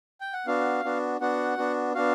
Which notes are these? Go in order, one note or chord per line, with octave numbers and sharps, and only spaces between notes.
G5
F#5
B3 D4 F#4 F5
B3 D4 F#4
B3 D4 F#4 F#5
B3 D4 F#4
B3 D4 F#4 F5